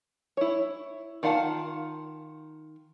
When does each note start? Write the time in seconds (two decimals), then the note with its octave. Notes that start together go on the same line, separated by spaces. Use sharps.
0.37 E4 C#5
1.23 D#3 F4 F5 F#5 A5